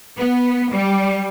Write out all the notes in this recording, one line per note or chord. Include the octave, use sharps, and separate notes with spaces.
B3
G3